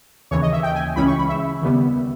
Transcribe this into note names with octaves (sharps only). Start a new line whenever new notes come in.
D#2 C#3 E3 C#5
D#5
E5
G5
G#5
C#2 C#3 E3 G#3 C#4 B5
C#6
B5
E5
D#2 C#3 G3 B3